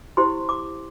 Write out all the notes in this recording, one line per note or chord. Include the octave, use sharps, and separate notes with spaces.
E4 G4 C5 C6
D6